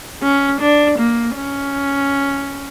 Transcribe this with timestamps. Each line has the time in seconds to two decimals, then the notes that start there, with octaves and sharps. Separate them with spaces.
0.22 C#4
0.60 D4
0.98 A#3
1.36 C#4